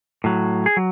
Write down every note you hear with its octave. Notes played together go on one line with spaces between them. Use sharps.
A2 F#3
G#4
F#3